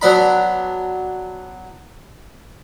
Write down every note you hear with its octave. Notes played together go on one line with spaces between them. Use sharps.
F#3 B3 D4 B5